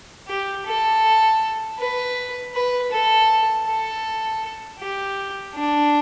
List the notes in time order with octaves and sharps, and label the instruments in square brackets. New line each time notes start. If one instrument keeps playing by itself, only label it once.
[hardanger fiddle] G4
A4
B4
B4
A4
A4
G4
D4